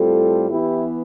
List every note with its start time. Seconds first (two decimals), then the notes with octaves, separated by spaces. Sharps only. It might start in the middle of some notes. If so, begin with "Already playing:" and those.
Already playing: A2 G3 C4 F4 A4
0.50 E3 B3 E4 G4